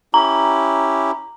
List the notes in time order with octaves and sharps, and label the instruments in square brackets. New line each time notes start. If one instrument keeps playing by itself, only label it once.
[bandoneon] C#4 E4 G4 [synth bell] A#5